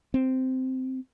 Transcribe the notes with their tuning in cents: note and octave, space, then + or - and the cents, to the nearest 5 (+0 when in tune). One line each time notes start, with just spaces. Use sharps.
C4 -10